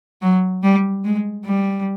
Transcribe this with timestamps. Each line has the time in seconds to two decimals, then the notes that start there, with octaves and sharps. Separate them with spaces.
0.22 F#3
0.63 G3
1.04 G#3
1.45 G3